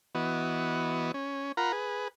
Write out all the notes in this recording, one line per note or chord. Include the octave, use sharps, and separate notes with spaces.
E3 B3 F#4 D#5
C#4
F4 A#4 F#5 A#5 B5
G#4 B4